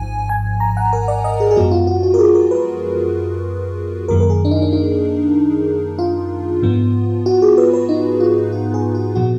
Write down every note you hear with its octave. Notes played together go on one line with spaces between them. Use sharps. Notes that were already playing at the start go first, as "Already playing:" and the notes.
Already playing: G#1 G#2 F3 G#5
G#5
A#5
F#5
A#4
D5
D#5
G#4
G#4
F#2 F3 G#3 B3 F#4
F4
F#4
F#4
A#4
G#4
A#4
B4
F#2 D#3 A#3 A#4
A#4
G#4
D4
D#4
D4
D#4
F4
G#2 F3 B3
F#4
G#4
B4
B4
D#4
F4
F#4
G#4
F#4
A#2 F3 B3 F#4